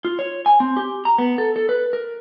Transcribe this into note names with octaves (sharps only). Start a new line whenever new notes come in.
F4
C#5
G#5
C4
G4
A#5
B3
A4
A4
B4
A#4